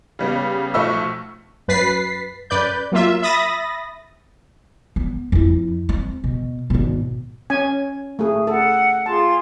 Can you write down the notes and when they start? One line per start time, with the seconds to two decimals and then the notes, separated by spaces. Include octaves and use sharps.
0.19 C#3 G3 B3
0.74 B1 F3 A3 C#6 E6
1.68 F#2 B4 A6 B6 C7
2.50 F#2 B4 D5 G6
2.92 F#3 A#3 F4 E5
3.22 E5 B5 D#6 A6 A#6
4.96 B3
5.32 F2 E4
5.89 C4
6.24 B2
6.70 G#1 B2
7.50 C#4 G#5
8.19 A3 G#4
8.47 A4 F#5
9.06 F4 G#4 A5 C6